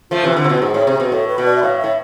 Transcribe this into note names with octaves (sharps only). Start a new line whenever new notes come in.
F3 A3 F4
C3 E3
D3
C3
B2
G#2 G#4
A2
C3
B2
A2 A4
B4
B2
D5
E5
A2 F5
A2 E5